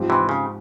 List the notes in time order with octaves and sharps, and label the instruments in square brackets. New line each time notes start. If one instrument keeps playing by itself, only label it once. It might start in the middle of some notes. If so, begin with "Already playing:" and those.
Already playing: [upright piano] G#2 F3 C4 G4
[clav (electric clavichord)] C3 E3
C#3